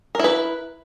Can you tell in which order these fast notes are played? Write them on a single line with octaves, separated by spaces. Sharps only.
A#4 E4 B4